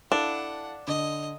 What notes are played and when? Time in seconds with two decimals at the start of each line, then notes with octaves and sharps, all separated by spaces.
0.12 D4 E4 A4 F5 F#5
0.88 D3 D#5